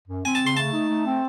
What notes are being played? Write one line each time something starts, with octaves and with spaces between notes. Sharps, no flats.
F#2
C4 G#5
A5
C#3
C6
A3 A5
D#4
A3
C4